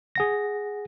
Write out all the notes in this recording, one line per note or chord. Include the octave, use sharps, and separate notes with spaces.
G#4 F#5 A#6